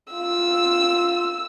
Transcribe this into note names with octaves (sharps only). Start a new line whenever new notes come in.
F4 E6